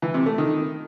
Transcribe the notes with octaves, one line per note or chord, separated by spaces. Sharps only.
E3
C3
A3
D#3